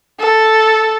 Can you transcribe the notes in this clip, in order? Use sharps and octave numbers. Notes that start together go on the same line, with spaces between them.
A4